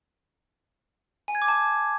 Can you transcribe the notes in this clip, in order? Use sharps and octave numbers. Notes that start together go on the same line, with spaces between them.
G#5
G#6
D6
A5